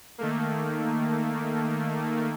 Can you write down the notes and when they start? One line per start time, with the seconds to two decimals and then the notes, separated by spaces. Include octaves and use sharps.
0.18 D#3 A3 A#3